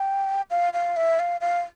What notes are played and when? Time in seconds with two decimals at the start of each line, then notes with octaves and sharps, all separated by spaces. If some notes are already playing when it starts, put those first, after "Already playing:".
Already playing: G5
0.50 F5
0.74 F5
0.97 E5
1.19 F5
1.41 F5